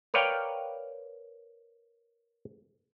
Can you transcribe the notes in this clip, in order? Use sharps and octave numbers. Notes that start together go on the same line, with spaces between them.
A#4 B4 C#5 D5 F5 G5